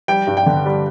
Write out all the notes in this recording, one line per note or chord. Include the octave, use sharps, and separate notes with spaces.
G3 G5
G2
G5
D3
G3